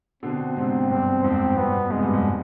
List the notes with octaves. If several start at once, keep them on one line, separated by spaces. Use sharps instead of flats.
B2 D3 C4
G#2 C3 C4
G2 B2 C4
F2 G#2 C4
G2 B2 B3
G#2 C3 G#3
G2 B2
F2 G#2